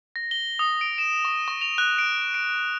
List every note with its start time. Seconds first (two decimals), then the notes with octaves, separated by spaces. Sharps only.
0.16 A#6
0.31 G7
0.59 D#6
0.81 D7
0.98 E7
1.25 C#6
1.48 C#6
1.61 F7
1.78 F#6
1.98 D7
2.34 D7